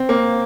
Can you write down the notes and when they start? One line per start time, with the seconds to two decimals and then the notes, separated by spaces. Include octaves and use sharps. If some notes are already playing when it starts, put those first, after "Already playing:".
Already playing: C4
0.09 A#3